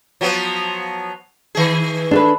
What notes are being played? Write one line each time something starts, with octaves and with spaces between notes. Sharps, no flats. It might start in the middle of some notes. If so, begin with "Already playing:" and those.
F3 F#3 B3
D#3 G#4
D4 A4 B4